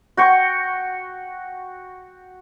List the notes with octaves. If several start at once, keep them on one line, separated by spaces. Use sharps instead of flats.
F#4 G5 C#6